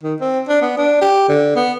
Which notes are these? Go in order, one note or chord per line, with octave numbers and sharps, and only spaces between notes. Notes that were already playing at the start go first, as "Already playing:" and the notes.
D#3
C4
D4
B3
D4
G4
D3
B3